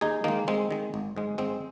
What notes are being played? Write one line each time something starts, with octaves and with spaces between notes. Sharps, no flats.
D#2 D#4 G#4
D#3 G#3 A#3 D#4
D#2 G#3 C4
D#3 G#3
G#1
G#2 G#3
G#1 G#3 C4